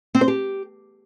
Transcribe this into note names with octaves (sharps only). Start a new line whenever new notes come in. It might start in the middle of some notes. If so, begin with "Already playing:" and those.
C4
C5
G4